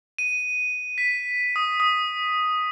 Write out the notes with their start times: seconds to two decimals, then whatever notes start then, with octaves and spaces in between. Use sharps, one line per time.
0.18 D#7
0.98 B6
1.56 D#6
1.80 D#6